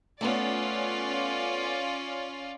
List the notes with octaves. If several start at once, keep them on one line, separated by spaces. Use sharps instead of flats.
A3 B3 C#4 F4 D5